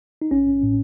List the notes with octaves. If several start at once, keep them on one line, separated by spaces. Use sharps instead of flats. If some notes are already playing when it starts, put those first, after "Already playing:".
D#4
A1 C#4
A2